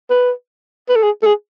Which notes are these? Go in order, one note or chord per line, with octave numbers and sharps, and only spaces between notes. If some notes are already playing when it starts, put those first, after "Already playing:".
B4
B4
A4
G#4
A4
G#4